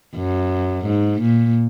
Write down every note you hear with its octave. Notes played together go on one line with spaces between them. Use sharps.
F#2
G#2
A#2